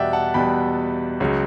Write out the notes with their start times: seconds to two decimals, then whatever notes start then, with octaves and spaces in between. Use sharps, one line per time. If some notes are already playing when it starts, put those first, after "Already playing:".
Already playing: E2 B2 G3 D5 E5 F#5 G5
0.13 F#5 A5
0.34 E2 B2 G3 G5 B5
1.20 C#2 C#3 F#3